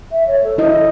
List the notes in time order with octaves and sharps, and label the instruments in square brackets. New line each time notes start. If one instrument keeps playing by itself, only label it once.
[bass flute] E5
C#5
A4
[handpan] E4 D#5